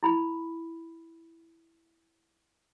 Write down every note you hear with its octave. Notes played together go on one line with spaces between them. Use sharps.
E4 B5